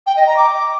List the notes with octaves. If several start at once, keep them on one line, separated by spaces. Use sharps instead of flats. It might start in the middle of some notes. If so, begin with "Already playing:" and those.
G5
D#5
A#5
D6